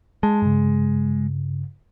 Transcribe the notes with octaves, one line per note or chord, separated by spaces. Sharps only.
G#3 A5
G2 C#3